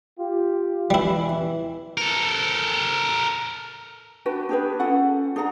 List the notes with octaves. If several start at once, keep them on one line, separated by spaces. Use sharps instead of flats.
F4 G4
E3 G3 E4
A4 A#4
D4 F#4 B4 G5
D4 G4 G#4 B4
C#4 F4 A4 F#5
D4 G#4 F#5 A#5